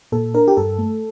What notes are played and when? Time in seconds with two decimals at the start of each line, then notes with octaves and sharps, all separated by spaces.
0.12 A#2 A4
0.34 D4 A#4
0.48 G4
0.57 G2 A4
0.78 A3